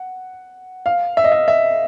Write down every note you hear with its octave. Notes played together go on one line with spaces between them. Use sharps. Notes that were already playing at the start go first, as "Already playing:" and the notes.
Already playing: F#5
F5
E5
D#5
E5
E5